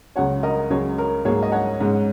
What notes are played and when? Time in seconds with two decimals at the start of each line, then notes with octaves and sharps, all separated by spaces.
0.16 C#2 C#3 F#3 C#5 F#5
0.43 A#4 D#5
0.70 C#2 C#3 F#3 C#4 G#4 C#5
0.98 A#4
1.25 G#2 F#3 A#3 G#4 C#5
1.43 D#5
1.52 C#5 F#5
1.80 G#2 G#3 C#4